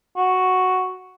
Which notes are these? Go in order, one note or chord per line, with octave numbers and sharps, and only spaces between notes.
F#4